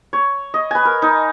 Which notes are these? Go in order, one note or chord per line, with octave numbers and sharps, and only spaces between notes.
C#5
D#5
B4 G#5
A#4
D#4